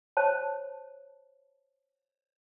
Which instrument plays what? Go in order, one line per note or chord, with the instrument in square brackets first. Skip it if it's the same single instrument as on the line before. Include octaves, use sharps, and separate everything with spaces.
[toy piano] C5 C#5 A5